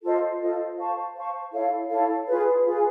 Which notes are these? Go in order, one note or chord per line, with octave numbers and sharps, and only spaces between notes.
F4 A4 C5 D#5
F4 A4 C5 D#5
C5 F5 A5 C#6
C5 F5 A5 C#6
E4 A4 C#5 F5
E4 A4 C#5 F5
F4 G#4 B4
F4 G#4 B4